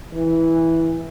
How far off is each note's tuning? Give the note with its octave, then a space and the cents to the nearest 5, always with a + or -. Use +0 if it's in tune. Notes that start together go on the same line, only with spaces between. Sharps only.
E3 -10